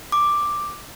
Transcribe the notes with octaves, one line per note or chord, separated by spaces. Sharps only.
D6